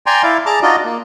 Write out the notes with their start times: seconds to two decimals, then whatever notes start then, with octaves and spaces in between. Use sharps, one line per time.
0.06 D5 G5 G#5 A#5 C6
0.23 E4 D5 F5
0.46 G#4 D5 A5 A#5 D6
0.62 D4 D#4 F4 F#4 D5 D#5
0.84 A#3